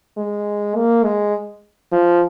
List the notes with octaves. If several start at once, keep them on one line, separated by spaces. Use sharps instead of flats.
G#3
A#3
G#3
F3